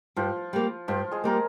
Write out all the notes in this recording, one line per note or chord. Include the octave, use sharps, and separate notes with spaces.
G2 F3 F4
G3 A#3
G2 F3 F4
G#3 G#4
G3 A#3 A#4